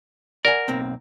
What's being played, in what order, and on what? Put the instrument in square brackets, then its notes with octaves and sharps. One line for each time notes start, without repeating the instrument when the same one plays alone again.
[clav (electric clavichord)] A#4 [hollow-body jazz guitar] D5 F#5 G#5
[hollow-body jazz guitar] B1 A#3 C4